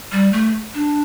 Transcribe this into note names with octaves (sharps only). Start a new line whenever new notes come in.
G3
A3
D4